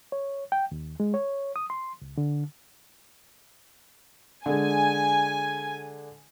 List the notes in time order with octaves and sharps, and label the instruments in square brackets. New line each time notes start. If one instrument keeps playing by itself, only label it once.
[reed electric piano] C#5
G5
D#2
G#3
C#5
D#6
C6
C#2
D3
[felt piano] D3 G#3 [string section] G#5